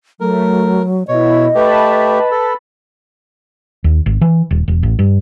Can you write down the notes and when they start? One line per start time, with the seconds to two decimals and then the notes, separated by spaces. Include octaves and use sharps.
0.20 F#3 A3 A#4
1.08 B2 E4 C#5 D#5
1.55 A3 G4 B4 A5 B5
2.31 A4
3.84 D#2
4.06 G#1
4.21 E3
4.51 D#1
4.68 E1
4.83 A1
4.99 G2